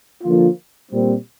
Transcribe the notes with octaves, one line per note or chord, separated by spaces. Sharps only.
D3 F3 A#3 F4
A#2 G3 C4